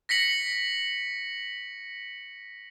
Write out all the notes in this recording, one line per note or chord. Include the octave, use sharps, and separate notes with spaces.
A#6 B6 C#7 F#7